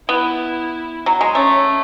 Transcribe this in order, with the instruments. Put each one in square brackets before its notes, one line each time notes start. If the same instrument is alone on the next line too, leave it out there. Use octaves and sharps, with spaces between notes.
[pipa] B3 [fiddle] E4
[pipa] F#3
G#3
[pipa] A3 [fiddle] C#4